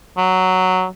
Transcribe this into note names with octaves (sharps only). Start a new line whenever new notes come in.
F#3